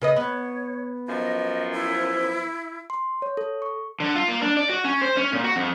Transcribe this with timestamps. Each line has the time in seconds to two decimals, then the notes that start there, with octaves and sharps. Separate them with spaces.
0.01 C#3 B4 D#5
0.16 B3 C#5
1.08 F#2 F3 D#5
1.72 E4
2.90 C6
3.22 C#5
3.37 A4
3.62 C#6
4.00 D3
4.15 F4
4.28 A#3
4.42 D4
4.57 D5
4.70 F#4
4.85 C#4
5.02 C5
5.17 C#4
5.32 A#2
5.44 F#4
5.56 F2